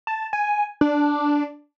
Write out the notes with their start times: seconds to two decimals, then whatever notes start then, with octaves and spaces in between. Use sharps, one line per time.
0.07 A5
0.33 G#5
0.81 D4